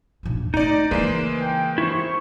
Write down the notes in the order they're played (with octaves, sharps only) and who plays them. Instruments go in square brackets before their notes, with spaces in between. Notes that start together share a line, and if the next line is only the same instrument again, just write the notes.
[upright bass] A#1 D#2
[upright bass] A3 [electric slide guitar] D#4 [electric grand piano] D5 A#5
[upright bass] C#3 E3 [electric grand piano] G#3 A#3 [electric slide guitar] B4 C5
[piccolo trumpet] G5
[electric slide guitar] E4 C5 [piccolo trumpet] C#6